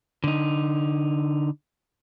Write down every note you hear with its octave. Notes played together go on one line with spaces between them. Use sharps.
D3 D#4